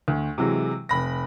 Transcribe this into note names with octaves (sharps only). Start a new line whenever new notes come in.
D2
C3 E3 F#3 G#3
F1 B5 A#6